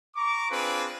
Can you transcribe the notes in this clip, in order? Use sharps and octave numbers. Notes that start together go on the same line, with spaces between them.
A#5 C#6 D6
C4 D4 F4 G#4 B4